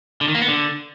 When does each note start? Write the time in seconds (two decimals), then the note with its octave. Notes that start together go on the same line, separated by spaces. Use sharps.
0.21 D3
0.28 D#3
0.35 A#3
0.41 B3
0.48 D3